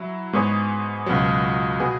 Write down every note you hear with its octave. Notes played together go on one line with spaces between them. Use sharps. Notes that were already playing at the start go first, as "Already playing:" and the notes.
Already playing: F#3 E4
G#2 G#3 B3 G#4 C#5
C#2 B2 F#3
B2 B3 G#4